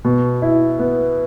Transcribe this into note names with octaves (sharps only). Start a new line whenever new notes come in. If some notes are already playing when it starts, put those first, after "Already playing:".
B2
E4
B3